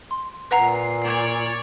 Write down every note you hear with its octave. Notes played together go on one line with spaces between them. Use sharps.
C6
A#2 B4 F#5 A#5 C7
C#5 D5